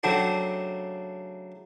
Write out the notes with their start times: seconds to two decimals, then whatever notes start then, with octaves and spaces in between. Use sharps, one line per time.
0.03 C#3 F#3 A3 C4 D4 F#4